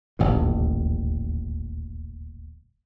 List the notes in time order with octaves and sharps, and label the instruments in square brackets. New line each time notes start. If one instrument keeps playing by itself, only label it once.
[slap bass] D#1 A1 D2 G2